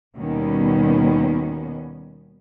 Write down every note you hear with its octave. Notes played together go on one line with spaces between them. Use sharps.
D#2 B2 D#3 G3 B3 C#4